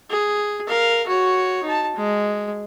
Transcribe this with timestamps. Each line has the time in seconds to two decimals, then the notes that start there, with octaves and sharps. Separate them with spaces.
0.10 G#4
0.67 A#4 F5
1.07 F#4 C#5
1.63 D#4 A5
1.96 G#3